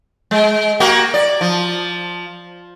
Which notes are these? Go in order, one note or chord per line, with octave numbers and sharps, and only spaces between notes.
G#3
A#3 F#4 G4
D5
F3